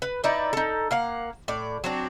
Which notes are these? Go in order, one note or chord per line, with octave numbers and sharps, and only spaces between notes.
B4
D#4 E4 B4 D5
D#4 A4
A#3 F5 F#5
A2 D5
F#3 C4 D4